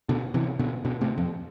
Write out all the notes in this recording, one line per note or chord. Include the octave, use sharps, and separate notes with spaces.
B2 D3
C3 E3
B2 D3
B2 D3
A2 C3
F2